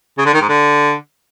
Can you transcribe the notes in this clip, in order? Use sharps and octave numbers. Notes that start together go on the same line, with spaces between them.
C#3
D3
D#3
G#2
D3